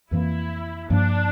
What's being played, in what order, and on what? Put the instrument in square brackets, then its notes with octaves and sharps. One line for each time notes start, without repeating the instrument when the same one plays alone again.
[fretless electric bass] F2 E3 A#3 [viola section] E4
[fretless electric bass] G2 F3 A#3 [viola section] D4